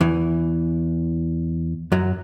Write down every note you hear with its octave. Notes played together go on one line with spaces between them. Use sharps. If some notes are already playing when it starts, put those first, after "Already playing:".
E2 E3
F#2 F#3